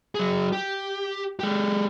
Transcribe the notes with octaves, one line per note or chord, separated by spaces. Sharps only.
F#3 G#4
G4
G#3 G4